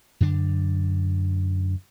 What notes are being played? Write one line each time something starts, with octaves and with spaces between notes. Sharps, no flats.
F#2 D3 D4